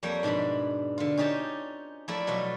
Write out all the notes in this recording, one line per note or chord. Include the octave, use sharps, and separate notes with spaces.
F2 G3 A#3 C#5 G5
G#2 B2 D4 F5 B5
D3 F4
C#4 D#4 G4 C#5 A5
F3 A3 E4 A4 A#4 D5
B2 F#3 F4 B4